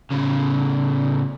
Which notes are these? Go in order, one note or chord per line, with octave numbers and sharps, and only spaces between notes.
A2 C#3